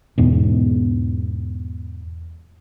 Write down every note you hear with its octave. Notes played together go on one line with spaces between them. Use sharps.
E2 G#2 B2